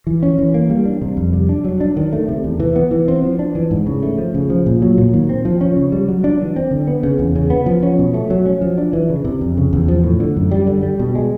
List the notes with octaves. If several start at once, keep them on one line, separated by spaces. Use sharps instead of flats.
E3
C#4
E3
A#3
G3
D4
C3
F2
G3
D4
F#3
D4
D#3
A3
C3
E2
E3
B3
E3
C4
F3
D4
E3
G#2
C#3
A3
F3
C#3
F3
A#2
F#3
A#2
D#3
C4
F3
C#4
C#3
G3
F#3
D4
E3
C4
D3
B3
C#3
E2
C#3
B3
F3
C#4
B2
A3
F#3
C#4
F3
D4
E3
C#3
C3
F2
C#3
E2
F3
A2
D3
F#2
G3
D3
G3
B2
G#3